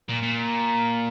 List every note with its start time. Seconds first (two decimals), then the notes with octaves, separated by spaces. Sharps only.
0.09 A#2
0.23 A#2